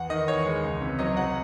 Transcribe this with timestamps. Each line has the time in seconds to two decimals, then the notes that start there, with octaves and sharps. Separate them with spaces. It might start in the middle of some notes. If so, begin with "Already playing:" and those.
Already playing: E2 F#5
0.10 D#3 D#5
0.28 E2 C#5
0.46 G#3
0.63 C#2
0.82 C3
0.99 F#3 D#5
1.17 F#3 F#5